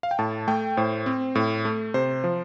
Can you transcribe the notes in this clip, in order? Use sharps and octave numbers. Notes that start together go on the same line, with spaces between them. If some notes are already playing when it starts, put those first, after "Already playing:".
F5
G5
A2 A5
A3 G5
A2 C5
C4
A2
A3
C3 C5
F3